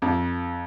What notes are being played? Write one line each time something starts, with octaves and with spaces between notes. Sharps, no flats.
F2